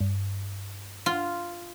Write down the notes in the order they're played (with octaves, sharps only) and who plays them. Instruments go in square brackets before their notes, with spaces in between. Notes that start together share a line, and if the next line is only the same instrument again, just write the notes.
[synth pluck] G2
[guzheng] F4